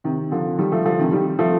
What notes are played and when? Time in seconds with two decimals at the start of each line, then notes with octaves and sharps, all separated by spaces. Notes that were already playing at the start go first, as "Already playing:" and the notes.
0.04 C3 D#3
0.32 D3 F3
0.58 D#3 G3
0.72 F3 A3
0.85 D3 F3
0.99 C3 D#3
1.12 D#3 G3
1.39 F3 A3